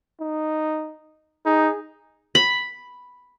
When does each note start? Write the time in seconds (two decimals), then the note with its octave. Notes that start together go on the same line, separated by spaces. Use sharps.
0.20 D#4
1.46 D#4 G#4
2.35 B5